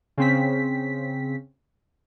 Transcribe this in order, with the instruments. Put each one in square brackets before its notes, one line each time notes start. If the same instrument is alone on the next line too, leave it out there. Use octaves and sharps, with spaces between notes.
[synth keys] C#3 C4 B6